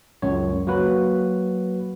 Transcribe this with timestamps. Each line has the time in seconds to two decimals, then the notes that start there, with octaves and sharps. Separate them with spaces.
0.22 C#2 F#2 C#5
0.67 F#3 A#3 F#4 B4